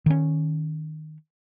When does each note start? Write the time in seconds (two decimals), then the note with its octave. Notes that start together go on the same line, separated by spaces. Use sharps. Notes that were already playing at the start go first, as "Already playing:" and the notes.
0.06 D#3 C#4